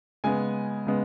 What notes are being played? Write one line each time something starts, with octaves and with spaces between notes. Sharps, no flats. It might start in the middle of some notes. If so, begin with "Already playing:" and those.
C#3 G#3 B3 G#5
C#3 G#3 B3